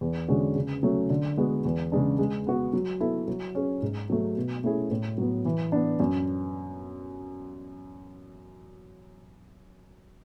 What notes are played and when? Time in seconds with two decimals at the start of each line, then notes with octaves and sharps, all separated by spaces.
0.01 E2
0.28 D3 G#3 C#4 F#4
0.56 C#3
0.83 F#3 A3 C#4
1.10 D3
1.37 G#3 B3 F#4
1.65 E2
1.92 C#3 G#3 D4
2.19 G#3
2.46 B3 F#4
2.73 F#3
3.00 B3 E4 A4
3.28 F#3
3.55 C#4 G#4
3.82 G#2
4.10 F#3 A3
4.36 B2
4.64 A3 C#4 E4 G#4
4.91 A2
5.18 F#3 B3
5.45 E3
5.72 B3 D4
6.00 F#2